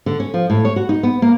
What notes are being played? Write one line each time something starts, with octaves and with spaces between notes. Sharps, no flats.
D3
C#4
F3
A2
C#5
F#4
D#4
B3
A#3